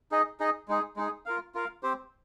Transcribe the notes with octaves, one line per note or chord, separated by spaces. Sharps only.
D#4 G#4 D#5
D#4 G#4 D#5
G#3 D#4 G#4
G#3 D#4 G#4
F4 A#4 F5
F4 A#4 F5
C4 G4 C5